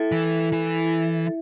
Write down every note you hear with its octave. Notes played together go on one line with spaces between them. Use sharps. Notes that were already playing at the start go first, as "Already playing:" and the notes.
Already playing: E4 A4
E3
E3